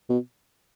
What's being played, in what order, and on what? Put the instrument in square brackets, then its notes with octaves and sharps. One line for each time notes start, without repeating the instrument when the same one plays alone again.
[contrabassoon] B2